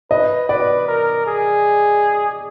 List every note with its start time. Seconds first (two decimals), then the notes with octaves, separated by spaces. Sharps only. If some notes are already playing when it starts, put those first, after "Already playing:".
0.11 B4 D#5
0.49 B4 D5
0.88 A#4
1.27 G#4